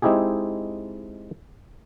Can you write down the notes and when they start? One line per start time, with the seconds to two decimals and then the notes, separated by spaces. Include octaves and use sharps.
0.02 G#3 C4 D#4 E4 G4 G#4